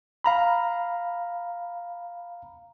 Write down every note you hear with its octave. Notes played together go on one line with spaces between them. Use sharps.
F5 A#5 B5